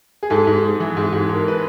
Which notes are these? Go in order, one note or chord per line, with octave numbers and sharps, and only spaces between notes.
G#4
G#2 A4
G#2
G#2
E3
G#2
G#2
G#2 A#4
B4